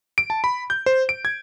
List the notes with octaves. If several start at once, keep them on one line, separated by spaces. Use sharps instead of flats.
D7
A5
B5
G6
C5
D7
G#6